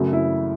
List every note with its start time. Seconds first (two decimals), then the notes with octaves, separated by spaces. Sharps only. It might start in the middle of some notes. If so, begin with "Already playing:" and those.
Already playing: F#2 C#3 F#3 A3
0.13 E4